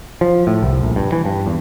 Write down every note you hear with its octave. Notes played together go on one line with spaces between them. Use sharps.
F3
A2
C2
A#1
G2
E3
G2
E2